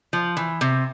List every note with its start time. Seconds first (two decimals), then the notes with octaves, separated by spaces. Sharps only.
0.13 F3
0.37 E3
0.61 C3